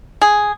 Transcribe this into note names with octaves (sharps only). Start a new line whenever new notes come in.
G#4